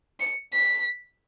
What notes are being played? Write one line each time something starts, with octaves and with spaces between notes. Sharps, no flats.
C#7
B6